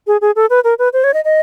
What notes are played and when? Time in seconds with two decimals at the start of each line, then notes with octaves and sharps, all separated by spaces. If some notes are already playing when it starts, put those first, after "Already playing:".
0.07 G#4
0.21 G#4
0.36 A4
0.50 B4
0.64 A#4
0.79 B4
0.93 C5
1.04 C#5
1.14 D#5
1.25 D#5